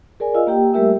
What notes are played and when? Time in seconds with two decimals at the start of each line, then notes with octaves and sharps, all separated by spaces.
0.20 G#4 A#4 D5 G#5
0.35 F4 D#5 F5 E6
0.47 A#3 G4 G5
0.73 G3 A3 G4 A#4 E5 E6